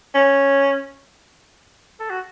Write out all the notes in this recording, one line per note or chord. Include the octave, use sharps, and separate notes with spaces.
C#4
A4
F#4